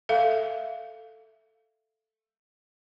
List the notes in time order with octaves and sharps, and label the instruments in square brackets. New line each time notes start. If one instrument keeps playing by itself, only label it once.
[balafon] A4 E5 F5